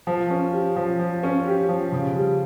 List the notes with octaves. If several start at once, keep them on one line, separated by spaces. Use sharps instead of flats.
F3
C#4
G4
F3
F3
C#4
G4
F3
C#3
G3